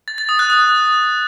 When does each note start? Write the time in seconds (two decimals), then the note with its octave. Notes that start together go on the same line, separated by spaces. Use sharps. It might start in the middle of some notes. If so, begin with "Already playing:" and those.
0.08 A6
0.18 A6
0.29 D#6
0.39 F#6
0.50 D#6